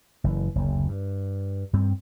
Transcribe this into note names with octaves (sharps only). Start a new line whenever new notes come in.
F#1 B2 E3
F#1 D2
G2
G2 G3 C4